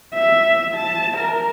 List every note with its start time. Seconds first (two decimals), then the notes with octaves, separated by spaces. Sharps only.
0.14 E5
0.75 A5
1.17 A#4